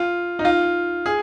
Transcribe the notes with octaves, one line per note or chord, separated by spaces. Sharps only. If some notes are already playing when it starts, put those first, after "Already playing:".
Already playing: F4
D#4
F4
G#4